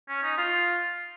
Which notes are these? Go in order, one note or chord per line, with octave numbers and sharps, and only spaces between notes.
C#4
D#4
F4